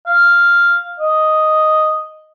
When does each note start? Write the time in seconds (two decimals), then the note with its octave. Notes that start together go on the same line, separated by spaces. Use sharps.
0.07 F5
0.99 D#5